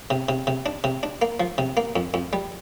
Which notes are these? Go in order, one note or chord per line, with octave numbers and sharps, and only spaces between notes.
C3
C3
C3
D4
C3
D4
A#3
F3
C3
A#3
F2
F2
G3